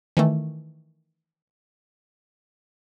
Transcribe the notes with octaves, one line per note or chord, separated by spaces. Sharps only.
D#3 E3 A3